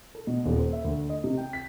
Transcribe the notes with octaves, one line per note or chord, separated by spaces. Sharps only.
A4
B2
D#1
C5
E5
D2
D#5
C3
G5
B6